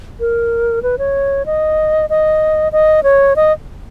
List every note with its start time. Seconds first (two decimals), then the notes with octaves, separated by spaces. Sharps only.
0.20 A#4
0.83 B4
0.98 C#5
1.46 D#5
2.10 D#5
2.72 D#5
3.03 C#5
3.36 D#5